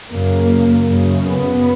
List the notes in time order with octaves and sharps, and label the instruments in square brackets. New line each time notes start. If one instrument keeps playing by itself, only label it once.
[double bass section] F#2 C#3 A#3
F#2 C#3
B3